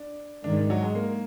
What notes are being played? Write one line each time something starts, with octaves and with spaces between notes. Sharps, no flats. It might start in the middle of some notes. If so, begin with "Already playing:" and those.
Already playing: D4
G#2 D#3 G#3 D4
D4
F#3
G#3
A#3